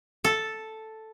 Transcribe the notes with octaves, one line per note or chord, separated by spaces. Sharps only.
A4